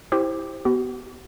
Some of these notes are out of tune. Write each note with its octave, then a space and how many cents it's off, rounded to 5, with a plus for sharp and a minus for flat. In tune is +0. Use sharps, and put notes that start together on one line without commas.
E4 -15 G4 +0 C5 +0
B3 +0 F#4 +45